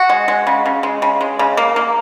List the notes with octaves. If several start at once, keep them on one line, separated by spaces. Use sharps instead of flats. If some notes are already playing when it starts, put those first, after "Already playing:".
Already playing: F#4
G#3
G#3
C#3
C#3
G#3
C#3
G#3
C#3
A#3
A#3